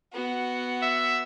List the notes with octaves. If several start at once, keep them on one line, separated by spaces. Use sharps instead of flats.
B3 F#4
E5